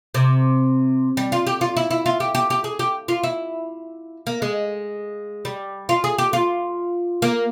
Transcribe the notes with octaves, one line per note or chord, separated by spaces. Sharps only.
C3
G3
F4
G4
F4
E4
E4
F4
G4
G4
G4
G#4
G4
F4
E4
A#3
G#3
G3
F4
G#4
G4
F4
A#3